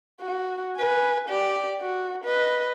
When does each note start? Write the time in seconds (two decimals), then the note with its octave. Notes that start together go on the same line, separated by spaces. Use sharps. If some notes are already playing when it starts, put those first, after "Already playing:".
0.21 F#4
0.77 B4 G#5
1.29 G4 D5
1.81 F#4
2.24 B4 D#5